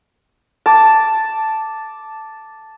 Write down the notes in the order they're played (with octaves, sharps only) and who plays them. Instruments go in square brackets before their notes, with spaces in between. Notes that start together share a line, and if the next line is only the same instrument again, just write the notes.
[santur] A5 D6